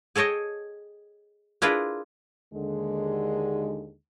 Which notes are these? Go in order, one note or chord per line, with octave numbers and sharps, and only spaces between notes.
G#4 A4 C#5 D#5 G5
D4 E4 F4 G#4 A#4 B4
D#2 D3 G#3